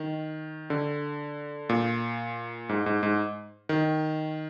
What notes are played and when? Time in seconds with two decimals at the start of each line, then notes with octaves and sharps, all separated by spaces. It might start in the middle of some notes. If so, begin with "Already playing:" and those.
Already playing: D#3
0.70 D3
1.69 A#2
2.69 G#2
2.86 G#2
3.03 G#2
3.69 D#3